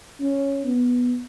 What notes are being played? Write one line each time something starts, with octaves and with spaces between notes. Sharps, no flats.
C#4
B3